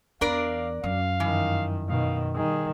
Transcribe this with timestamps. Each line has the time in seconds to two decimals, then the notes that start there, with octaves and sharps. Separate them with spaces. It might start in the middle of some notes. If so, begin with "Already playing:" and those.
0.21 E2 D4 A#4 D5 F5
0.84 F#2 F5
1.20 G2 D#3 E3
1.89 B2 D#3 F5
2.36 D#3 G3 G#4